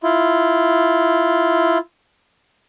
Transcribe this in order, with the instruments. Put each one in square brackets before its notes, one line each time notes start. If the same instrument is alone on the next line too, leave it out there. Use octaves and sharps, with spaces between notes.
[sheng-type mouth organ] E4 F4